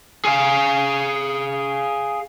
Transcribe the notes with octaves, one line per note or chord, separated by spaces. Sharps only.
G#4 F5